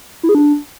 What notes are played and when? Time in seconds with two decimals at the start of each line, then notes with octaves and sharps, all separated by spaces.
0.23 E4
0.29 G#4
0.35 D4